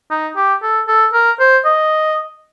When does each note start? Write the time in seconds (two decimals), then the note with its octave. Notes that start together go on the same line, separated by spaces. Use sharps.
0.11 D#4
0.36 G4
0.63 A4
0.88 A4
1.14 A#4
1.40 C5
1.65 D#5